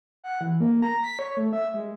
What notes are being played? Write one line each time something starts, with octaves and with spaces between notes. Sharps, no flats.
F#5
E3
A#3
A#5
B6
C#5
A3
E5
G#3